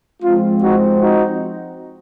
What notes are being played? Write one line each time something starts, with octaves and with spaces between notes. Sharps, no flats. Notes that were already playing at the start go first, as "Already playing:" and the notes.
F3 G#3 C4 F4
D#4 F#4
D#4 F#4